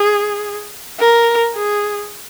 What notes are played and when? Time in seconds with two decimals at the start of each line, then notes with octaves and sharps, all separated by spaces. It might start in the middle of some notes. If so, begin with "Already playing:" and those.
Already playing: G#4
0.99 A#4
1.54 G#4